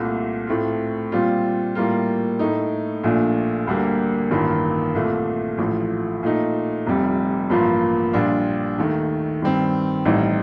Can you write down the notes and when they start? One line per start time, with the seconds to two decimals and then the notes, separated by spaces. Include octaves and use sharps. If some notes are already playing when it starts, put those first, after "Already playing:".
Already playing: C2 A#2 A3
0.47 A2 A3 C4 F4
1.12 A#2 G3 C4 F4
1.75 A2 G3 A#3 F4
2.39 A2 A3 D#4
3.03 A#1 A#2 A3 D4
3.67 D2 D3 G3 A#3
4.31 A1 G2 D#3 A#3 F4
4.95 C2 A#2 A3
5.58 A1 A2 F3 A3
6.23 A#2 A3 D#4
6.87 F1 F2 C3 G3
7.50 A1 G2 F3 A#3 F4
8.13 A#1 A#2 G3 D4 F4
8.78 D#2 D#3 A3
9.42 G2 D#3 G3 C4
10.05 A1 A2 G3 C4 D#4